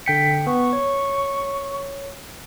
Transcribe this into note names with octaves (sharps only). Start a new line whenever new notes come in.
D3 G5 B6 C#7
B3 C#6
C#5